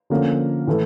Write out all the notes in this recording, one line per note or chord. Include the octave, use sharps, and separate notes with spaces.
D3 F3 A#3 C#4
A2 E3 A3